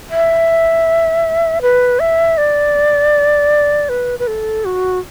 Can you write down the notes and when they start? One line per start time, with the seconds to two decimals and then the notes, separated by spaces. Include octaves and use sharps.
0.10 E5
1.62 B4
2.00 E5
2.38 D5
3.89 B4
4.19 B4
4.27 A4
4.65 F#4